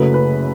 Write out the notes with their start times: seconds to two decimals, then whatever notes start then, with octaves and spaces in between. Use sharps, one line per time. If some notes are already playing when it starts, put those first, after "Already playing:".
Already playing: F#1 F#2 C#3 F#3 A3 B4
0.14 B4